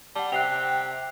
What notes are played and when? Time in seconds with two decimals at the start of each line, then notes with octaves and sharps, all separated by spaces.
0.16 G3 F#5 A5
0.32 C3 G5 F#6 C7 F7